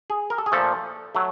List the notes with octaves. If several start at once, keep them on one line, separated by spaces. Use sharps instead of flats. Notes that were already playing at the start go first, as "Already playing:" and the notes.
G#4
A#4
A4
G#4
A#2 F3 A3 A4
F#3 A3